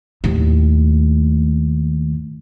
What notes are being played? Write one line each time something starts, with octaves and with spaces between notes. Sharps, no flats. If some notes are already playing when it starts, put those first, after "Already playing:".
D#2 A2